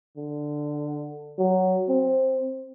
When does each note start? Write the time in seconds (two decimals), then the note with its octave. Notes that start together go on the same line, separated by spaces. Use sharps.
0.17 D3
1.39 F#3
1.89 C4